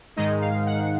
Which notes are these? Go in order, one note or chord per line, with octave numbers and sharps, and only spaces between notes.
G#2 D#3 G#3 D#4 D#5
F5
F#5